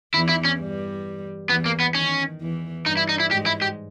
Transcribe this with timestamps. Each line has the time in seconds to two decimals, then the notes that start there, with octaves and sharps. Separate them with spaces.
0.14 E2 E3 E4
0.29 E4
0.45 C#4
0.59 G2 G3
1.49 E2 E3 B3
1.66 A#3
1.80 B3
1.95 D#3 C#4
2.40 E2 E3
2.86 G2 G3 D#4
2.97 E4
3.09 D#4
3.20 E4
3.31 G#2 G#3 G4
3.46 E4
3.62 G4